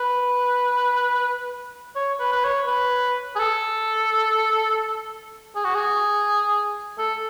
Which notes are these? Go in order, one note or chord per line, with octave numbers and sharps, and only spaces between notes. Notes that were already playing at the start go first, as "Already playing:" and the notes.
Already playing: B4
C#5
B4
B4
C#5
B4
G#4
A4
G#4
F#4
G#4
A4